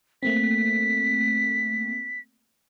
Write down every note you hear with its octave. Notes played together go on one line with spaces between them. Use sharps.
A3 A#3 C4 B6